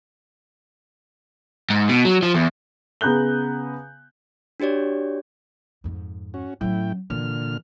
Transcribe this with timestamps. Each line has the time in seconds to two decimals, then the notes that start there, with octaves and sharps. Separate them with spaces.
1.70 G#2
1.89 B2
2.05 F#3
2.23 F3
2.34 E2
3.01 C#3 B3 A#5 F#6 G6 G7
4.60 D4 F#4 G4 C#5 D5
5.84 F2 G#2
6.34 C#4 F#4
6.61 A2 F#3 C#4 E4 G5
7.10 A#2 D3 E3 F6